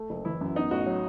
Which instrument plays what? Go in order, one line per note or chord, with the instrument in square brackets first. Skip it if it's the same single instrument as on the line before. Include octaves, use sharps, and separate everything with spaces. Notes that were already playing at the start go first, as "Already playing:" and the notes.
Already playing: [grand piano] A3
F#1
[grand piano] E3 [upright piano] E4
[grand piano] F#2
[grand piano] B3 [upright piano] D#4
[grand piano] A1 [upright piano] F#4
[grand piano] F#3